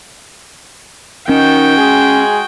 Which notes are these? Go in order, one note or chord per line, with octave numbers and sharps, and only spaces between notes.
D#3 C#4 F#4 G5
G#3 G#4